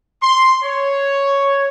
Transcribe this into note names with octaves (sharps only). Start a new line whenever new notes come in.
C6
C#5